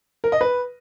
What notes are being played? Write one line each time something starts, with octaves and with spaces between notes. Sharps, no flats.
A#4
D#5
B4